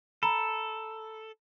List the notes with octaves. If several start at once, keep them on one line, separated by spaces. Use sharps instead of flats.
A4 A#5 B5